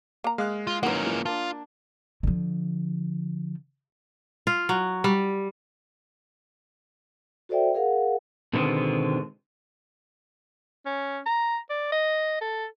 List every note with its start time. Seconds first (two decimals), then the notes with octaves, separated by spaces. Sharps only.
0.24 A#3 A#5
0.38 G#3 F5 D#6 F#6
0.67 F4
0.83 D#3 E3 F#3 A#3 C#4 B4 F#5
1.06 E3 F3
1.26 A#3 D4 F4 A5
2.23 D3 F3
4.47 F4
4.69 F#3
5.04 G3
7.49 F#4 A4 C5 D5 E5 G5
7.74 G#4 A#4 F5 F#5
8.53 B2 D3 D#3 G#3 B3 C4
10.86 C#4
11.26 A#5
11.70 D5
11.92 D#5
12.41 A4